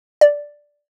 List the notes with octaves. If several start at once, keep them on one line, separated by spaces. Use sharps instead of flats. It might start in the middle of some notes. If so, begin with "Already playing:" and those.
D5